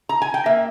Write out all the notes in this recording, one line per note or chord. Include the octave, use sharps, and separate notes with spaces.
A#5
G#5
G5
A#3 E5